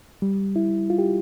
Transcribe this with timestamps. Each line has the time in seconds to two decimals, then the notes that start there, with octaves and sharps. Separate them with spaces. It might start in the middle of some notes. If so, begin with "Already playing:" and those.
0.22 G3
0.56 E4
0.90 F4
0.98 G4